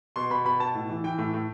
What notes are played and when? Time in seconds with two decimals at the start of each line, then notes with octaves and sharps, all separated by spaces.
0.16 B2 C6
0.30 B2 B5
0.45 B2 B5
0.59 B2 A5
0.75 A2
0.89 E3
1.04 E3 G5
1.18 A2
1.34 A2